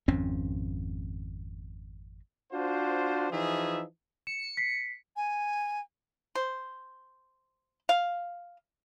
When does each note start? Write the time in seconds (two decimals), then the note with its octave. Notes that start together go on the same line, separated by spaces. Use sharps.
0.08 G#1 F2 C4 C#4
2.52 D4 F4 F#4 C5
3.30 E3 F3 D#4 G#4 E5
4.27 C#7 E7
4.57 B6 C7
5.16 G#5
6.35 C5
7.89 F5